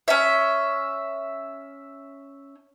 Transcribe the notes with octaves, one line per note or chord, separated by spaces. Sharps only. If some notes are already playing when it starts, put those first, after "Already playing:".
C#4 E5